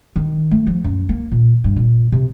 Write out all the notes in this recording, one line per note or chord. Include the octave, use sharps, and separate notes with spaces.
D#3
A3
F3
F#2
A#3
A#2
G2
A#2
C3